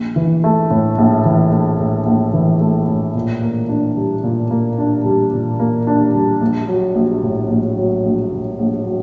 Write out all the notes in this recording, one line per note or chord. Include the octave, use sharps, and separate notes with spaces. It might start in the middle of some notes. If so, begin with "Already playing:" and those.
Already playing: A#1
E3
A3
A2
A#1
E3
A3
A2
A#1
E3
A3
A2
A#2
A#3
D4
G3
A#2
A#3
D4
G3
A#2
A#3
D4
G3
A#1
F#3
A#1
A2
A#1
F#3
A#1
A2
A#1
F#3